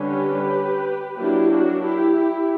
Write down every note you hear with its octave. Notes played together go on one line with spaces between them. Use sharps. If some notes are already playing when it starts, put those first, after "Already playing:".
Already playing: D3 G3 C#4 G4 B4
F#3 A#3 D4 E4 G4
D4 F#4
E4 G4
E4 G4